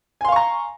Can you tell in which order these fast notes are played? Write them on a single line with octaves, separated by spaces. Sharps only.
G#5 C6 F5 C#6 A#5